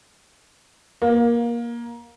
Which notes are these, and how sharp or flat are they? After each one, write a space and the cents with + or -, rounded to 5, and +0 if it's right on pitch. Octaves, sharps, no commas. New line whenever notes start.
A#3 +20